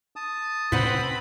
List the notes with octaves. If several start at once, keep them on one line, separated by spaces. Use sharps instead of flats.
A5 D#6
A2 C3 C4 C#4 B4 C5 F#5 B5